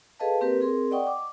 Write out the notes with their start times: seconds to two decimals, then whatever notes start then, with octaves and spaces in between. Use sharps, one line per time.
0.20 G#4 A4 B4 D#5 F5 A5
0.41 A#3 C4 G4 A#4 B4
0.61 C4 G#4 A#4 C6
0.91 D5 D#5 F#5 G5 C#6 D#6
1.07 D6